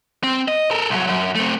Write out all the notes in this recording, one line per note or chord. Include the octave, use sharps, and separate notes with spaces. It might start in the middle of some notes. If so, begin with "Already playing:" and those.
C4
D#5
A4 A#4
C2 F#3
F#2
A3 C4